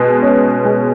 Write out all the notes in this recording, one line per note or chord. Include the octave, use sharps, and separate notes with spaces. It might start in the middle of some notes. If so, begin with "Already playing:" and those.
Already playing: B2 G#3
C#4
G#3